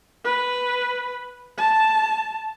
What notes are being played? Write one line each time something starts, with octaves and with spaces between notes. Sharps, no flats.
B4
A5